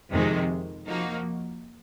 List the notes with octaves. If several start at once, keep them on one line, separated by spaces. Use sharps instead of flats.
F2 C3 D#3 G#3
F3 A#3 D#4 F#4